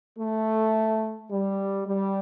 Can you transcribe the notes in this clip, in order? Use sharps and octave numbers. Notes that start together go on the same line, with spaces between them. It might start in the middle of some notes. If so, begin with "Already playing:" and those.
A3
G3
G3